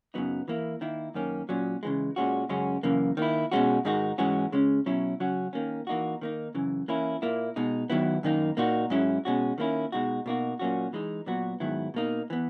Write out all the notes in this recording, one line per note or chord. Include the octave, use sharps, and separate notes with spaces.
F#2 C#3 F#3 B3 D#4
E3 A#3 E4
D#3 A#3 E4
F#2 D#3 A#3 C#4
A#2 F#3 C#4
C#3 E3 G#3
A#2 G#3 C#4 F#4
F#2 C#3 G#3 C#4 F#4
F#2 C#3 E3 A#3
D#3 A#3 E4
B2 G#3 C#4 F#4
G#2 D#3 G#3 D#4 F#4
G#2 E3 G#3 C#4 F#4
C#3 G#3 C#4
B2 F#3 C#4 E4
C#3 F#3 C#4 F#4
D#3 A#3 C#4
E3 A#3 D#4 F#4
D#3 A#3 D#4
F#2 C#3 E3
E3 A#3 C#4 E4
A#2 A#3 E4
B2 G#3 D#4
D#3 F#3 B3 E4
F#2 D#3 A#3 D#4
A#2 A#3 D#4 F#4
G#2 F#3 C#4 E4
B2 G#3 C#4 F#4
D#3 A#3 C#4 E4
B2 G#3 D#4 F#4
B2 A#3 D#4 F#4
A#2 F#3 A#3 C#4 F#4
E3 G#3 D#4
A#2 F#3 B3 F#4
G#2 D#3 F#3 B3 E4
B2 A#3 D#4
E3 B3